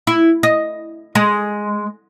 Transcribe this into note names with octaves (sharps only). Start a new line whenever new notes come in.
E4
D#5
G#3